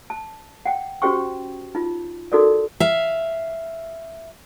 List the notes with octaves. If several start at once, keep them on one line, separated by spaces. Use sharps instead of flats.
A5
F#5 G5
C#4 F#4 G4 C5 G5 C#6
D#4 F4
D#4 F#4 A4 A#4 D5
E5 F5